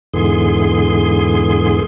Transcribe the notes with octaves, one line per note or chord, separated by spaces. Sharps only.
E2 G#2 D3 E3 G#4 C6